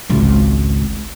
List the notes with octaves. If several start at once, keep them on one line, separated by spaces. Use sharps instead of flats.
G#1 C#2